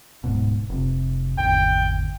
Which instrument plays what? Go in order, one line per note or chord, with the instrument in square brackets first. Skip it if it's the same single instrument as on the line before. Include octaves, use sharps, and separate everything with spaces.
[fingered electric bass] D1 G#2 B2
F1 C3
[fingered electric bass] G#1 E2 D3 [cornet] G5